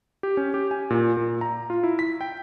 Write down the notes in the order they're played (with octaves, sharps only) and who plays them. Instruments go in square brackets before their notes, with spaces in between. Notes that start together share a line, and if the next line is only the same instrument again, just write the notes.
[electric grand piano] G4
C#4
G4
G#5
A#2
A#2
A#5
F4
E4
B6
G5